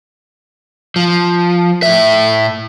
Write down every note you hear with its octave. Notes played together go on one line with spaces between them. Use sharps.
F3
A2 E5